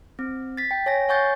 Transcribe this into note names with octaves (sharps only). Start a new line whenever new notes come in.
C4
A6 B6
G5
C#5 G#5 A#6
C#5 F#5 G#5 C#6 G6 A6